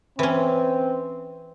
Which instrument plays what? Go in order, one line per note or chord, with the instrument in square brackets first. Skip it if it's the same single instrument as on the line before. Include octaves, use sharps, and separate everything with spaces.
[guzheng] E3 C#4 [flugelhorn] C4